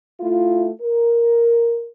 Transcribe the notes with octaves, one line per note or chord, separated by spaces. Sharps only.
A3 E4 F4
A#4